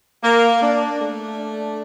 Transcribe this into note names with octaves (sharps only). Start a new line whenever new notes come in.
A#3
D4
A3
D4